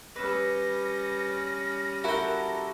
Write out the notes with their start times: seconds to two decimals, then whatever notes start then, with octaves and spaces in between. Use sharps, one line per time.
0.16 G3 C#4 B4 E6 A#6
2.04 E4 F#4 A4 A#4 G5